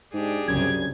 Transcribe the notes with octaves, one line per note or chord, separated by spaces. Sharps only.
G#2 D4 G4 G#4
C2 F#2 C#3 G#6